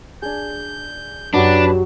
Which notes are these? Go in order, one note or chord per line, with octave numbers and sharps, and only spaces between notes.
D4 G#4 G6
F#2 F#3 D4 F#4 G4 B4